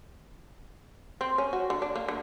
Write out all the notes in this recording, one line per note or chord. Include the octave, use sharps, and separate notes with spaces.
C4
C#4
F#4
D3
D4
A#3
D3